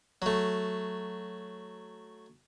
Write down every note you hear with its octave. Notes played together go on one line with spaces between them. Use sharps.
F#3 A3